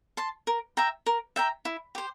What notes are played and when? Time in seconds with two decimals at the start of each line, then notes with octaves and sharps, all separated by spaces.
0.17 A5 C6
0.47 A#4
0.77 E5 G5 A#5
1.06 A#4
1.36 E5 G5 A#5
1.65 E4
1.95 G4 C5